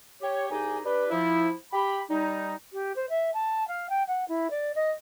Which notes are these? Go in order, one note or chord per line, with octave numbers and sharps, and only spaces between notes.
G4 C#5
C2 D#4 G4 G#4 G#5
D4 G4 B4
F3 E4
G4 B5
G3 D#4
G4
C5
E5
A5
F5
G5
F#5
E4
D5
D#5